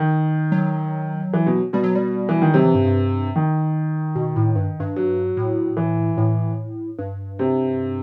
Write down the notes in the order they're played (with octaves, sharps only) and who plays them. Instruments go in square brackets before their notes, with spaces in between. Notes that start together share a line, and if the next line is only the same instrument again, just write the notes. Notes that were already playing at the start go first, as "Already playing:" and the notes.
Already playing: [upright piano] D#3
[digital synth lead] F#3
[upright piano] E3
B2
[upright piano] B2 [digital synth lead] G3
[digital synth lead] F#3
G3
[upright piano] E3
D#3
[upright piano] C3 [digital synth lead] F#3
[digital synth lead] E3
G2
G2
[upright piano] D#3
[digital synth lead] B2
A2
G2
G2
[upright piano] F#3
[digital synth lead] A2
[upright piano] E3
[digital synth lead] A2
G2
[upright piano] C3